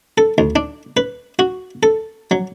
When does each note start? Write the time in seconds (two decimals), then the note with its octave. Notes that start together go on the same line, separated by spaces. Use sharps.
0.18 A4
0.38 D2
0.56 D4
0.97 B4
1.39 F#4
1.83 A4
2.31 F#3